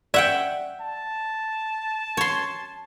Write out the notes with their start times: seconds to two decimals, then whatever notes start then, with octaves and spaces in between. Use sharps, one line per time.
0.14 D5 E5 F#5 G5
0.82 A5
2.17 C#5 C6